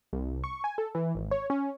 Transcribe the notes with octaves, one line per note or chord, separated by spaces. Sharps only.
C2
C#6
G#5
A4
E3
G#1
C#5
C#4